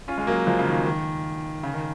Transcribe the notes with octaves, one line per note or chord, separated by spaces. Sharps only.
C#4 F4
G#3
F#3 A#3
F3 G#3
C#3
D#3
D#3
C#3
D#3